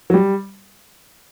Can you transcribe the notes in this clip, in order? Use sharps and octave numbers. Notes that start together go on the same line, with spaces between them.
F#3
G3